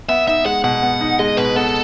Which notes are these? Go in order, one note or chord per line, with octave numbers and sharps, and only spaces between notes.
B3 E5
D#4 E5
G#3 F#5
B2 F#5
B3
D#4
G#3 D#5
B2 B4
B3 A4